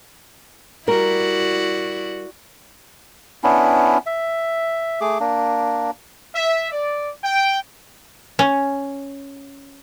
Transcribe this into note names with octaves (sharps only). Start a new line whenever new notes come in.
G3 E4 F#4 A#4 D5
B3 C#4 D4 E4
E5
A3 G#4 D6
A#3 D4
E5
D5
G5
C#4